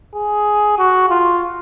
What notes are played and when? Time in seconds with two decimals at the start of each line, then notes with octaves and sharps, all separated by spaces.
0.15 G#4
0.79 F#4
1.10 F4